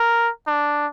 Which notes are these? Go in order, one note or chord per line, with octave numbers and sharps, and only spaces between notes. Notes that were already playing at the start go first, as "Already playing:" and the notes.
Already playing: A#4
D4